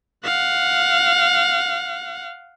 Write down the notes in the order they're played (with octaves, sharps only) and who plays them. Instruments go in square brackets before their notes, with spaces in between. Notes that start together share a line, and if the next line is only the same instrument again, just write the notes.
[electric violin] F5 F#5